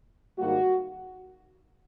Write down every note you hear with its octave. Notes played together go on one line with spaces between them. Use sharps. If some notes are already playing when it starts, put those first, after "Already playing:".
G#2 D#3 G3 A#3 F#4